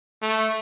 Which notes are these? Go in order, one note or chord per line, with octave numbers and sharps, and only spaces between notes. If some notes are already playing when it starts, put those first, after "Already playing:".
A3